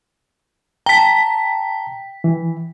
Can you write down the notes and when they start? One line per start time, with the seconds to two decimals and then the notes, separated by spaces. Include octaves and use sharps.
0.86 G5 A5 A#5 B6
2.24 E3